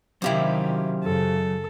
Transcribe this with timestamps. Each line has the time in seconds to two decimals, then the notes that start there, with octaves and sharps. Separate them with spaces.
0.22 C3 D#3 F#3 C#4 E4 G4 C5 F5
1.04 F#2 C#3 A4